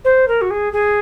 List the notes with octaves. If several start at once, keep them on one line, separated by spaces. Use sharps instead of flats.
C5
A#4
F#4
G#4
G#4